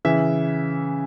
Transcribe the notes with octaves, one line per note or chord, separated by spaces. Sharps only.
C#3 E3 E5